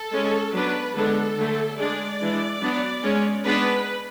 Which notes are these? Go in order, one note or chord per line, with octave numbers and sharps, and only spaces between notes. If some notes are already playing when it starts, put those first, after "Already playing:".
Already playing: A4
G#3 C#4
F#3 B3 D4 B4
D3 G#3 B3 D4 A4
D3 F#3 A3
G#3 D4 D5
E3 G#3 D4
F#3 B3 D4
G#3 C#4
G#3 B3 D4 B4